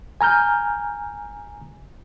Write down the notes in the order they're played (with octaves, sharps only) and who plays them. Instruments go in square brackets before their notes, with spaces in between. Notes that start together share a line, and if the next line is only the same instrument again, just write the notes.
[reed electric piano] G#5 A#5 F6 G6